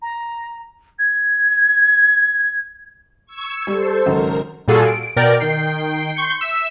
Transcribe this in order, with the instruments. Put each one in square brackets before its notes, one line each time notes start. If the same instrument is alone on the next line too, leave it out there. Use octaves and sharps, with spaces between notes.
[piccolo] A#5
G#6
[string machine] C#6 E6 G#6
[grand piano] G3 [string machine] A4 C5
[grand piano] G#1 C#3 F#3 [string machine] A#4
[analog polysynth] A#2 G3 F4 F#4 G#4 A4
D7
B2 A#4 D5 G5
D#3 G5 C7
C6 C#6 G6 C#7
E5 E6